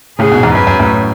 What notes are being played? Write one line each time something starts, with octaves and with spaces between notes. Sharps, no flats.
A2 C#3 G#4
G#2 B2
E2 G#2
F#2 B4
F#2
F#2 A2